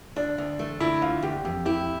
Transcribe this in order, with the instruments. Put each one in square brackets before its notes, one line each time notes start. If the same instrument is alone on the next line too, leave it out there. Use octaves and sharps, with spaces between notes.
[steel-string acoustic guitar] D2 [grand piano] D4
[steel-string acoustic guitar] D2
A3
[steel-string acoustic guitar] D3 [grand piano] E4
[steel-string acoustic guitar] D2 [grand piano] F4
[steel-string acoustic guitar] D2 [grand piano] G4
[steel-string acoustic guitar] F2 [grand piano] G4
[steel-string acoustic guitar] E4 [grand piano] G4